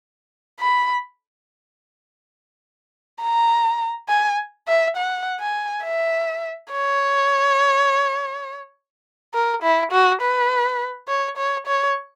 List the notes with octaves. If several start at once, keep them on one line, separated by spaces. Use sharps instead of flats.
B5
A#5
G#5
E5
F#5
G#5
E5
C#5
A#4
E4
F#4
B4
C#5
C#5
C#5